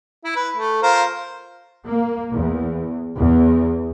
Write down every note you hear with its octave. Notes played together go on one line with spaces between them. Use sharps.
E4
B4
A3
F4 A#4 C5
A#3
E2
E2